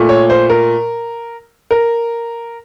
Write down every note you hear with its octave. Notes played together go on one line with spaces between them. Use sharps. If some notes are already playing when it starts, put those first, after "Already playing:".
Already playing: A#2 A3
C#5
C5
A#4
A#4